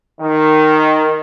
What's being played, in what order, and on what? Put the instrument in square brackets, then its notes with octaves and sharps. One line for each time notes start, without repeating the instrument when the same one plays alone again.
[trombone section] D#3